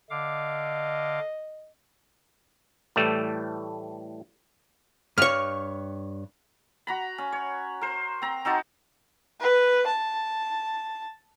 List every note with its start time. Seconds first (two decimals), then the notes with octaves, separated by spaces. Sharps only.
0.10 D3 D#5 F5 D6
2.96 A2 E3 G3 A3
5.18 G2 C#5 C#6 F6
6.87 F#4 A#5 B5
7.18 C#4
7.32 C#5
7.81 A#4 C5
8.22 C4 A#5
8.45 C4 D#4 F#4 A5
9.40 B4
9.87 A5